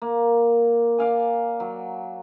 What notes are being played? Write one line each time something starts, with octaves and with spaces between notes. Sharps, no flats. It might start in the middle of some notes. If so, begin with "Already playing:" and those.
A#3
D5 F5 G#5
F#3